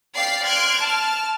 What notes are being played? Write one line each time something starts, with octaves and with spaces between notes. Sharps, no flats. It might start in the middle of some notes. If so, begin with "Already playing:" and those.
D5 F5 G5 A6 B6 C7
C6 F6 F#6 G#6 D7
A5 F6